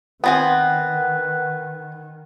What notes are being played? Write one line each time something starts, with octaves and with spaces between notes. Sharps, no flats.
D#3 B3 C4 B4 F#5 G#5